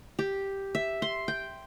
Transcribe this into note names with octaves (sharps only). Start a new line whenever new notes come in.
G4
E5
C6
G5